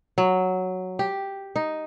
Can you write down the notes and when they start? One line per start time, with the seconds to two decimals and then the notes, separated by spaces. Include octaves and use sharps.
0.18 F#3
0.99 G4
1.56 D#4